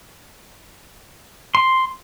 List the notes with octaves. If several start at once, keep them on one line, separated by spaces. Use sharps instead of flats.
C6